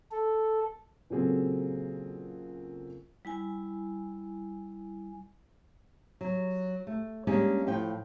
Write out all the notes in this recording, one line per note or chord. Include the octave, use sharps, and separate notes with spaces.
A4
A#2 C#3 F#3 C4 G#4 A4
G3 E4 G#5
F#3
A3
G3 G#3 A#3 C#4 D4
A2 F3 G5